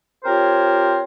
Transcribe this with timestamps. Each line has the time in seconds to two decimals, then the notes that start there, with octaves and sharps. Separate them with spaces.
0.24 C4 F4 G4 A#4 C5 C#5